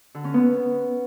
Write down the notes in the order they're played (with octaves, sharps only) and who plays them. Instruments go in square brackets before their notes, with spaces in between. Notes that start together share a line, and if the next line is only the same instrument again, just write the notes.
[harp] D3
C#4
B3